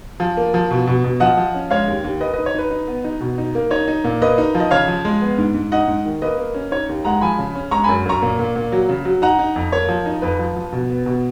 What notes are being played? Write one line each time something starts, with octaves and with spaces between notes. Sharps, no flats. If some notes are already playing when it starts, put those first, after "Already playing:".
F3
A#3
F3
B2
B2
B2
F3 D#5 F#5
F3
C#4
G#3 C#5 F5
D#2
D#2
A#3 B4 D#5
B4 D#5
D#4
C#5
D#4 B4
D#4
B3
D#4
B2
D#4
A#3
D#4 C#5
D#4
A#2
A#3 B4 D#5
D#4
F3
D#5
C#3 C#5 F5
F3
G#3
B3
G#2
G#2
D#4 D#5 F#5
G#2
D#3
A#3 B4 D#5
A#3
C#4
D#4 C#5
D#2
G#3 F#5 A#5
F3 G#5 B5
C#3
C#4
G#3 A#5 C#6
G#5 B5
F#2
F#2 A#5 C#6
A#2
A#2
A#2
F#3
C#3
F#3
D#4 F#5 A#5
D#4
F2
A#3 C#5
F3
D#4
F2 B4
F3
F3
B2
B3
B2